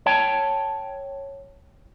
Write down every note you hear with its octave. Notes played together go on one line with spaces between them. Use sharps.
C#5 G5 A5